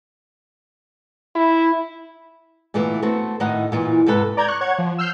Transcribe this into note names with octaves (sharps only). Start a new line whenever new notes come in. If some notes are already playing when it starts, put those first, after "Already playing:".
E4
A#2 D3 E3 A3 B3
A3 B3 C4 F#4
A2 D#3 D#4 E4 D#5 F#5
A#2 E3 F4
G#2 C3 A4 B4
D5 A#5 G6 G#6
C#6 F#6
C#5 F#5 G#6
F3
E6 F6 G6 C7